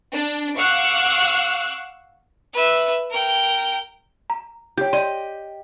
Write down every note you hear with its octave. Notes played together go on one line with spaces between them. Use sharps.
D4
F5 F#5 C#6 D6 E6 F#6
B4 E5
A#4 G5
A#5
G4 C#5 G6
D5 D#5 C6